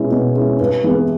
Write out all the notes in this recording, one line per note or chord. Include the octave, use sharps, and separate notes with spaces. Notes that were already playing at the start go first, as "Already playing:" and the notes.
Already playing: B2 G#3 C#4 E4
B2
G#3 C#4 E4
G2
E3 G#3 B3 E4